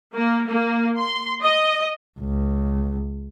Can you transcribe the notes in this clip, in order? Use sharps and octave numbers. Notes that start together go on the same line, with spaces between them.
A#3
A#3
C6
D#5
C#2